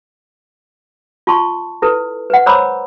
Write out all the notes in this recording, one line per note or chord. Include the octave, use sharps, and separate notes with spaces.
F4 A5 C6 C#6
E4 A4 B4
B4 F#5
C5 C#5 A#5 B5 D6 E6